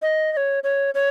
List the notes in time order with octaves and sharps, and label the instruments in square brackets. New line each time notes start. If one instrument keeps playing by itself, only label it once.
[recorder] D#5
D#5
C#5
C#5
C#5